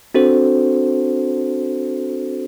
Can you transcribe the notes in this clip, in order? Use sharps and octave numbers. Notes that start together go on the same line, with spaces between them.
C4 D4 F#4 A4 C5